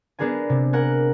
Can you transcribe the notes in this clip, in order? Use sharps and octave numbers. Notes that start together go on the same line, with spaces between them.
B3 D4 G#4 A#4 G#5
C3
A#4 F#5 G#5